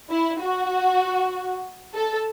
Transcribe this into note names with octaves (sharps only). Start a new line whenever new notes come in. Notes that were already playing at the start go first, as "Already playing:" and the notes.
E4
F#4
A4